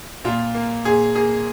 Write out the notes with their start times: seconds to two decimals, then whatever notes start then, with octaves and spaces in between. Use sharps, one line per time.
0.24 A#2 F4
0.55 A#3
0.85 A#2 G#4
1.15 A#3 G#4